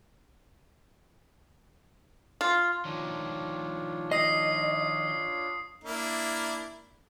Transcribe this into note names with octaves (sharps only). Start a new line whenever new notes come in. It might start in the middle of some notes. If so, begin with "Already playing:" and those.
F4
D#3 F3 D4 F4 C#5
D#5 D#6 C7
A#3 D4 E4